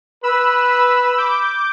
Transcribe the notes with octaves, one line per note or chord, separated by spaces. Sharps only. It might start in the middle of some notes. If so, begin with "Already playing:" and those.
B4 B5 E6
B5 E6
D6 G6